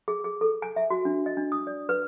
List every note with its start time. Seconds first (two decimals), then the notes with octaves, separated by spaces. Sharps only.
0.08 G#4
0.24 G#4
0.41 A4
0.62 G#5
0.76 E5
0.90 F#4
1.05 D4
1.26 D#5
1.37 D4
1.52 D#6
1.67 D5
1.89 B4